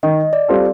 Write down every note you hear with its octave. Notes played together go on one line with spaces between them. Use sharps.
D#3 D#5
D5
G3 C4 F4 A4